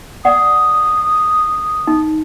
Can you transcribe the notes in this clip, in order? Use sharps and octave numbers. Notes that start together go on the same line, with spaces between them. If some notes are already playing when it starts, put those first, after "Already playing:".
D5 F#5 D#6
D#4